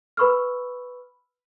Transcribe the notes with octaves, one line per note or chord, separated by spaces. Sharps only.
B4 B5 C#6 E6 F6